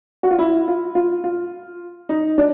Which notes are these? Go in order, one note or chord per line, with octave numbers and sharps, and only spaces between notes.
F#4
F4
E4
F4
F4
F4
D#4
D4